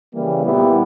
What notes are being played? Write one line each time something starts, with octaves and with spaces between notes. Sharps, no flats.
C#3 E3 G3 A#3
A#2 G3 B3 E4 G4